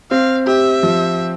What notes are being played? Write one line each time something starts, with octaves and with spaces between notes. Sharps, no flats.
C4 F5
G4 E5
F3